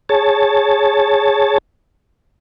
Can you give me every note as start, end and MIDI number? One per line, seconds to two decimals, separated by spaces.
0.09 1.58 68
0.09 1.58 73
0.09 1.58 81